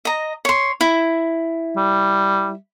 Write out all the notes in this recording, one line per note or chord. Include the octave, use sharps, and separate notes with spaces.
D#5 A#5
C#5 C6
E4
G3